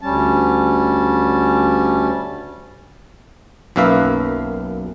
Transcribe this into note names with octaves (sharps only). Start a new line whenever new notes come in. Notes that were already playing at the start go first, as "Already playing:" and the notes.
D2 G3 C#4 A5
B1 F#2 A#3 B4 E5 F5